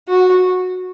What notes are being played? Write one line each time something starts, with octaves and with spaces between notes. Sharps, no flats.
F#4